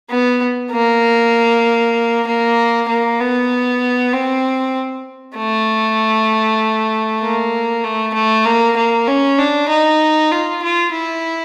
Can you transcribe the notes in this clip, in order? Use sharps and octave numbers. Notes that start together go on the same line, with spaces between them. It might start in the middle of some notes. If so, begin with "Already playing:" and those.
B3
A#3
A#3
A#3
B3
C4
A3
A#3
A3
A3
A#3
A#3
C#4
D4
D#4
F4
F4
E4